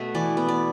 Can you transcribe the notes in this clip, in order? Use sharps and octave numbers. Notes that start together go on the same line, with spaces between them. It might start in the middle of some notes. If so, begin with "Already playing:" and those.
Already playing: B2 A3 E5
E3 D5
B3
D5